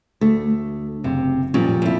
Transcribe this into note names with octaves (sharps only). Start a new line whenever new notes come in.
D2 A3
F#1 C3
F1 A#2 F3 G3 C#4
F2 E4